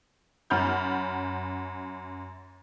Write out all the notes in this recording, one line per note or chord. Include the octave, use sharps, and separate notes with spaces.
F#2 F#5 B5 F6 G6